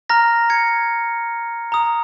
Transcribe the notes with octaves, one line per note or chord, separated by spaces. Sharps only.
A#5 F6 A#6
G#6 C#7
A#5 D#6